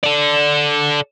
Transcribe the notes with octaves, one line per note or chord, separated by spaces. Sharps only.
A4 D5